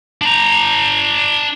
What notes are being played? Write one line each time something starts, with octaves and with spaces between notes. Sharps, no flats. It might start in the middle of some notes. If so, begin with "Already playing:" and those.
D4 A#5